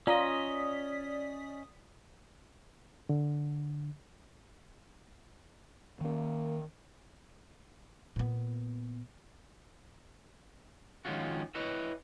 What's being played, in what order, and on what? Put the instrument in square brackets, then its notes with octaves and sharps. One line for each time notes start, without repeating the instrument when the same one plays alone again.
[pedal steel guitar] C#4 D#5 [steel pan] F4 A#5 [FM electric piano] D5 D#6 B6
[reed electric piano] D3
[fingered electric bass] D#3 C#4 [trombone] A#3
[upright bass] A#2 B3
[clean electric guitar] D#3 F3 G#3 C#4 F4 F#4
E4 B4 C#5 D#5 E5